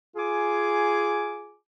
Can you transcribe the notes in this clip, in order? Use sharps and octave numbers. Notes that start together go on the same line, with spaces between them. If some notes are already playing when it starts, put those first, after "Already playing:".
F4 G#4 G#5 D6